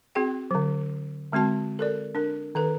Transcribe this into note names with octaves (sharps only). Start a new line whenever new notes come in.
C4 F#4 G#4 G5
D3 F#3
D3 G#3 C4 F#4 A5
A4 A#4 D5
D4 A#4
D#3 A4 B4